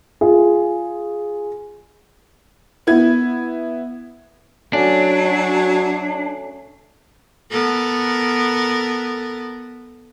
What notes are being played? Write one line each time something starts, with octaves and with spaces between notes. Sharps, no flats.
F4 G#4
B3 E4 G#6
F#3 A3 C#4 D4 F#4
B3 A4 A#4